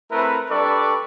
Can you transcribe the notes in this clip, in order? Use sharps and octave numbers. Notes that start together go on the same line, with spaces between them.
A3 C4 E4 A#4 B4
G3 D4 A4 B4 D5 C#6